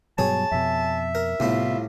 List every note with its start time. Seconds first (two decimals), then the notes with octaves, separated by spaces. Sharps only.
0.18 G2 B2 F#3 G#4 C#5 A5
0.52 F2 B2 E5
1.15 A#4
1.40 C2 A2 C3 B3 E4 F4